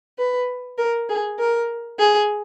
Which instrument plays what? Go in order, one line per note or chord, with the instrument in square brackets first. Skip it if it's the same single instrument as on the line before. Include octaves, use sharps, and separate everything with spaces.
[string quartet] B4
A#4
G#4
A#4
G#4